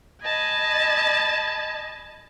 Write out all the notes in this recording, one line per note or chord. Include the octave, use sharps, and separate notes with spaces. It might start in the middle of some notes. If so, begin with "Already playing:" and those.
D#5 G#5 A5 B5